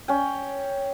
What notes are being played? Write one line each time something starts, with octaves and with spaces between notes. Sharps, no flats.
C#4 G5